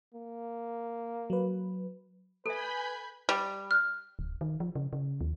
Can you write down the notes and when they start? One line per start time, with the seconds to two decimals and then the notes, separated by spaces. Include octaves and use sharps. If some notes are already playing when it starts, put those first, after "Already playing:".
0.14 A#3
1.30 F#3 B4
2.46 A4 B4 E5 G#5 B5 G6
3.29 G3
3.71 F6 F#6
4.19 D1
4.41 D#3
4.60 F3
4.75 C#3
4.93 C#3
5.21 D#2